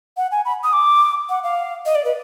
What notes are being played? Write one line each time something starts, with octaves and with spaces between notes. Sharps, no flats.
F#5
G#5
B5
D#6
D6
F#5
F5
D#5
D5
B4